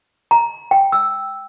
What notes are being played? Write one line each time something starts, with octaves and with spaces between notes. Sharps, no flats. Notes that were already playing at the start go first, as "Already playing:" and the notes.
A#5
G5
E6